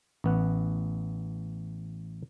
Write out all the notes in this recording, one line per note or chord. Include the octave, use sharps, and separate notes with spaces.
A1 B3 F#5